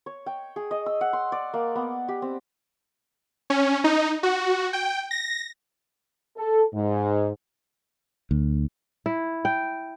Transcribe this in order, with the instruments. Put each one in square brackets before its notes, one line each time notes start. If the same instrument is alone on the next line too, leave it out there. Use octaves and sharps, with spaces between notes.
[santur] C#5
G5
G#4
D#5
E6
F#5
C6
D5
A#3
B3
G4
C4
[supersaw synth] C#4
D#4
F#4
G5
A#6
[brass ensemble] A4
G#2
[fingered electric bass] D2
[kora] E4
G5